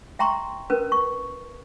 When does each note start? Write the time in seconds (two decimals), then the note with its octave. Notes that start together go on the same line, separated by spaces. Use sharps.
0.19 E5 G5 A#5 C6 C#6
0.70 C#4 A#4 B4
0.92 C#6